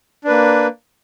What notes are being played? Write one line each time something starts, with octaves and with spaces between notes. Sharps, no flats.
A#3 D4 B4